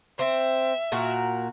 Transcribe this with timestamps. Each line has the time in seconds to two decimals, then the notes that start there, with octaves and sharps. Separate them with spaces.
0.19 C4 E5
0.92 A#2 F#4 A#4